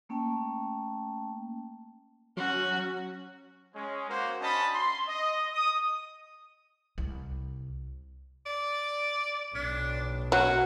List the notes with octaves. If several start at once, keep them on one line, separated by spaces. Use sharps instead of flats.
A3 A#3 C#4 G5 A5
F#3 C#4 F#4
G#3 C#4 C#5
A#3 F#4 C5
C#4 D4 F#4 D#5 A5 B5
C6
D#5
D#6
C2
D5
B1 D4
F#3 C#4 F#4